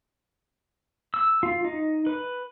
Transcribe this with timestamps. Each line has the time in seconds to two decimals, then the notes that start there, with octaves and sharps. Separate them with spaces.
1.14 E6
1.43 F4
1.65 D#4
2.07 B4